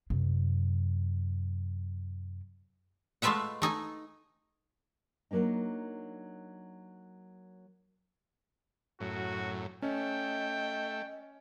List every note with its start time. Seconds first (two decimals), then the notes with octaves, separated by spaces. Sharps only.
0.10 F#2 C3
3.22 G#3 A3 F4 B4 E5 F#5
3.62 A3 D#4 G#5
5.31 F#3 A#3 D4 D#4
9.00 F#2 A2 F#4
9.82 A3 C#4 D#5 G5